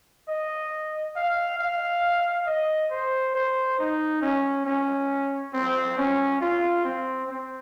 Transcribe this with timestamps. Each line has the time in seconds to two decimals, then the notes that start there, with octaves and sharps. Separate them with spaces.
0.28 D#5
1.16 F5
1.59 F5
2.46 D#5
2.91 C5
3.35 C5
3.79 D#4
4.22 C#4
4.66 C#4
5.53 C4
5.97 C#4
6.41 F4
6.84 C4
7.29 C4